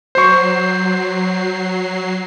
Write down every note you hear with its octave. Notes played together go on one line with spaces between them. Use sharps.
F#3 C5 C#6 C7